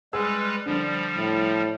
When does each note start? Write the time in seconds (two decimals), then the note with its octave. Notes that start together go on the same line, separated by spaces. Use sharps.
0.13 G3 G#3 G#4 B4 E6
0.66 D3 F3 G3 D4
1.17 A2